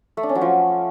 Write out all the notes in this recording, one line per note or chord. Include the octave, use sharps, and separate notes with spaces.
A3
D4
C#4
F#3
F3